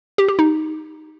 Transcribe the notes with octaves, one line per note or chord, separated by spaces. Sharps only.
G4
G4
D#4